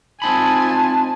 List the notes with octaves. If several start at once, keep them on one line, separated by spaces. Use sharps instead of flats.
C4 D#4 F4 G#5 A5 B5